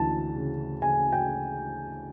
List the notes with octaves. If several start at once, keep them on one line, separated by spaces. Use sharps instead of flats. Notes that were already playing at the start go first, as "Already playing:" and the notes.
Already playing: D2 E3 A5
C#3
C#3 G#5
G5